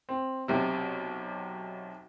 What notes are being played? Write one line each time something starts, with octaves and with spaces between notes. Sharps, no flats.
C4
B1 C3